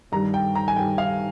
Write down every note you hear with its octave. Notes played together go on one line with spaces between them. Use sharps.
G2 D#3 G3 A#5
G5
A#5
G#5
G2 D#3 G3 G5
F5